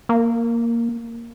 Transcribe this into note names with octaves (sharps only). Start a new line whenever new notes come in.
A#3